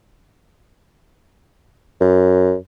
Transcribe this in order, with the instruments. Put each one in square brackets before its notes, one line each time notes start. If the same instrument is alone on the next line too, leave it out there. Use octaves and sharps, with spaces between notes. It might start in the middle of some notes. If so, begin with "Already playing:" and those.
[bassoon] F#2